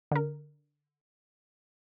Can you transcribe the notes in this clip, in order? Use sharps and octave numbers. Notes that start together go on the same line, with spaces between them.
D3 A#4